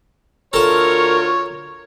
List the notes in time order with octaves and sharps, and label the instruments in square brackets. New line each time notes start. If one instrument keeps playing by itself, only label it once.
[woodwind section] D2 F4 C#6 [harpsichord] A4 A5 [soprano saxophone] A#4 [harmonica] C#5